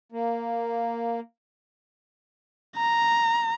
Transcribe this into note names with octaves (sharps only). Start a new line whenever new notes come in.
A#3
A#5